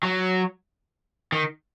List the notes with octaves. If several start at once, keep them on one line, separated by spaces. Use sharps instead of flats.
F#3
D#3